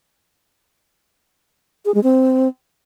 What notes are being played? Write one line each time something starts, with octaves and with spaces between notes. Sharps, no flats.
G#4
G#3
C4